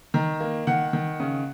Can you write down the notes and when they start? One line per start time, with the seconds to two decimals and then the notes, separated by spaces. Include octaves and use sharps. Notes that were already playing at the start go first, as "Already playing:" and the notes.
0.14 D#3 A#5
0.40 A#3
0.67 D#3 F#5
0.93 D#3
1.20 C#3